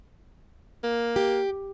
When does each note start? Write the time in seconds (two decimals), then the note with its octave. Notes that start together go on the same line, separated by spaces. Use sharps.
0.84 A#3
1.16 G4